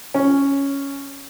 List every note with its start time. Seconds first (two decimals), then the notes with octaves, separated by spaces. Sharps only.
0.14 C#4